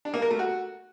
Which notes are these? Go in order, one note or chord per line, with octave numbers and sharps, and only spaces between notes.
D4
A#3
A#4
A3
F#4